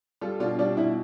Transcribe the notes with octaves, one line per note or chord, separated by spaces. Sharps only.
G3 F4 A4
B2 D4 F4
G3 D4 F4
B2 E4